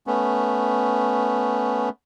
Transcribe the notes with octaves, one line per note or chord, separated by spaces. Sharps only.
A3 B3 C#4